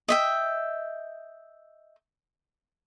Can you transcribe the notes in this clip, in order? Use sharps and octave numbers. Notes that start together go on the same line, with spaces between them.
D#5 E5 G5